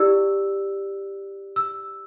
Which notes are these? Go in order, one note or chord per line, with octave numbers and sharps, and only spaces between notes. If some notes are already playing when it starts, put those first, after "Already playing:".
Already playing: E4 G4 D5 E6
E6